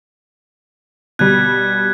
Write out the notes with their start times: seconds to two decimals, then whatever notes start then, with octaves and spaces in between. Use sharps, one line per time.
1.19 B2 G3 F#6 G#6